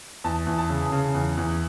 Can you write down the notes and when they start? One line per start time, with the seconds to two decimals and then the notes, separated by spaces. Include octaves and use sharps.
0.24 E2 A5
0.47 E2
0.58 A5
0.69 C#3
0.92 C#3
1.15 E2
1.37 E2